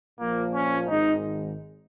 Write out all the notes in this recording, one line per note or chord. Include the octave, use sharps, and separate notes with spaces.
A#1 A#2 F3 A#3
C#4
G#1 G#2 D#3 D#4